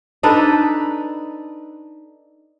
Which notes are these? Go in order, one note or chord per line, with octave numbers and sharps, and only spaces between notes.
D4 D#4 A4 B4